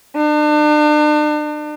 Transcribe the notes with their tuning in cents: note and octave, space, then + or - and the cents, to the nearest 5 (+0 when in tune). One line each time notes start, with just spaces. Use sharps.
D4 +40